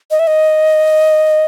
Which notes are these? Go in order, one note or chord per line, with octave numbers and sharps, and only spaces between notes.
D#5
E5
D#5